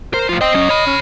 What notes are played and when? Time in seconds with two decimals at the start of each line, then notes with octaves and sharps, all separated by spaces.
0.14 A#4 C5
0.29 A2 F3 F4
0.41 C5 D#5 G5
0.54 F#3 C#4
0.69 C#5 B5
0.87 C#4